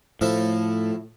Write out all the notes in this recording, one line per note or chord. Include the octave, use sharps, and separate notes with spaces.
A2 F3 E4 A4